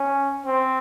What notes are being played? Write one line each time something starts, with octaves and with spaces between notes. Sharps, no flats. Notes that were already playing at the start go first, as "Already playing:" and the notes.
Already playing: C#4
C4